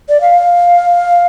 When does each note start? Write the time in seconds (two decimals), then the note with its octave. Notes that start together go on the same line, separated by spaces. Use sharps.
0.09 D5
0.21 F5